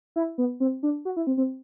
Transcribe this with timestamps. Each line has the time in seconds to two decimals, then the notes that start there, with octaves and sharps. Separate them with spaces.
0.16 E4
0.38 B3
0.60 C4
0.83 D4
1.05 F#4
1.17 E4
1.27 C4
1.37 C4